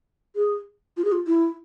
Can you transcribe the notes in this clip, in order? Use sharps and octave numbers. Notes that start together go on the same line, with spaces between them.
G#4
F4
G#4
F4
E4